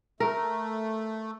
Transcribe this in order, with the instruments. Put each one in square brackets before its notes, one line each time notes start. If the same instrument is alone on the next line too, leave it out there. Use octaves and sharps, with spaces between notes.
[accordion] A3 [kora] A#4